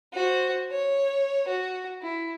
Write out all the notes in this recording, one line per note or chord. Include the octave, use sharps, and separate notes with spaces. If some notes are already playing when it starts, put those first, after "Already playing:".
F#4 C5
C#5
F#4
E4